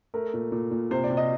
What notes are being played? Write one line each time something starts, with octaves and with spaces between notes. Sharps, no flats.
A3 A#4
A#2
A#2
A#2
C3 C5
D5
C3
D#5